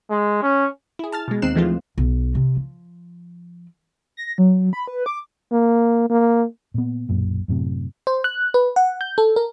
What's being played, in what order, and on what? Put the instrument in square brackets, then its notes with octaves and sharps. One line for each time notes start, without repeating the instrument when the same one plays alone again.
[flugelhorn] G#3
C#4
[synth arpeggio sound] E4 G#4
A5 F6 A6
B2 G#3
D#2 C4 D#4 F#6 C7 E7
E3 F3 G#3 A3 C4 F4
[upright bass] B1
C3
F3
[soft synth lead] A#6
F#3
B5
B4
D6
[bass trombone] A#3
A#3
[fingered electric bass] A#2 B3
B1 F#2 A#2
F#2 A2 C3
[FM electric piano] C5
F#6
B4
F#5
G6
A4
A#4